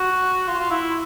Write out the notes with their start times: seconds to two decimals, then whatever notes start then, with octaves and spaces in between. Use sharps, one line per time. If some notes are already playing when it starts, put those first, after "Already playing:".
Already playing: F#4
0.48 F4
0.60 F4
0.71 E4